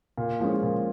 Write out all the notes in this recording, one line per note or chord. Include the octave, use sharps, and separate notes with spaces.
A#2
F3 G#3 C#4
A#2